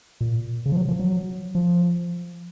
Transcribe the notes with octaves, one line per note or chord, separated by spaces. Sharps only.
A#2
C#3
F3
F#3
F3
F#3
F3